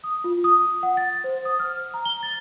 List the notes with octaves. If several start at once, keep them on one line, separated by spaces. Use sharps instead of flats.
D#6
F4
D#6
F#5
A6
C5
D#6
F6
A#5
G7
A6